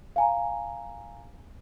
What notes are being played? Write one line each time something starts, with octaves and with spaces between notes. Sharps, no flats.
F5 G#5 A#5